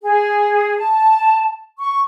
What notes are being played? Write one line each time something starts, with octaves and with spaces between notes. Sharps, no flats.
G#4
A5
C#6